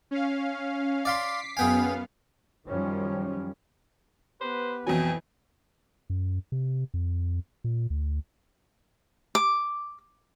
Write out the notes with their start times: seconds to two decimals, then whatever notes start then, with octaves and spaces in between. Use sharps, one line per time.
0.11 C#4 F5
1.05 D5 F5 C6 D6 B6 C7
1.57 F#2 B3 G#4 F5 G5 G#5
2.67 F#2 D#3 F3 G3 C#4
4.41 B3 G4 B4 C5
4.87 F2 B2 E3 F#3 G#5
6.10 F#2
6.52 C3
6.94 F2
7.64 A#2
7.90 D2
9.35 D6